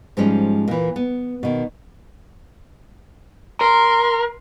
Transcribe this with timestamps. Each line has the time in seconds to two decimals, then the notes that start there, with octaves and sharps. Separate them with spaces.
0.17 G#2 F3 G3 G#3 C#4
0.68 A#2 E3
0.96 B3
1.43 B2 D#3
3.61 A#4 C6